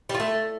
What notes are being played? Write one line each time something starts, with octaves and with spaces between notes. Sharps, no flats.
G3
F4
A3